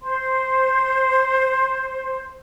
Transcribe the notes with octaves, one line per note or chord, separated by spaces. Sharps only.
C5 C6